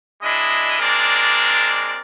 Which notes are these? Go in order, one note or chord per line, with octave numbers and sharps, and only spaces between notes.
G#3 D4 E4 D#5
G#3 C4 D4 A#4 D5